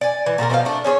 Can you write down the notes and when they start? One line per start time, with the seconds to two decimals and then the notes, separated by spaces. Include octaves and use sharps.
0.01 D5 G#5
0.26 E3
0.38 A#2 F#4 A4 A#4
0.50 B2 F3 A4 F5
0.65 A3 D4
0.84 C#4 G#4 C5 C#5